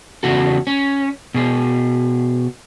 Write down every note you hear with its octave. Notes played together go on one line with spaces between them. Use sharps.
E2 C#3 F#4 A4
C#4
B2 G#4